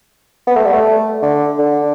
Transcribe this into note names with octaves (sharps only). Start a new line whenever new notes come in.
B3
A3
G3
A3
D3
D3